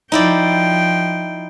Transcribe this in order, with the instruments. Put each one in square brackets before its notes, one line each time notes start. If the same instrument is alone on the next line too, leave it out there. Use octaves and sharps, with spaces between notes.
[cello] F3 G5 [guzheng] D#4 E4 D5